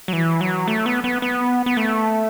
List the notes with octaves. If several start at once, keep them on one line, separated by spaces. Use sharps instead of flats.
F#3
E3
F#3
A3
B3
B3
B3
B3
A3